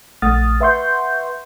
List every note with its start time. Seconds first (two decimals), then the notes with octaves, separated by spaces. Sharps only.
0.22 A#1 A3 F#5 D#6 F6 A6
0.60 B4 E5 F#5 C6 C#6 G6